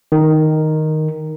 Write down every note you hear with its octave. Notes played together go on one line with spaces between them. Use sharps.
D#3